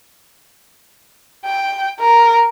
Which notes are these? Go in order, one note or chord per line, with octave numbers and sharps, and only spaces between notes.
G5
A#4